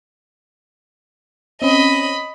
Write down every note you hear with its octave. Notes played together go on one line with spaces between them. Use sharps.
C4 C#4 D#5 B5